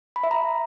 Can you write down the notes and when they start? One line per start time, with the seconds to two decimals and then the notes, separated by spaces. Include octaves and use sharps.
0.16 B5
0.23 E5
0.31 A#5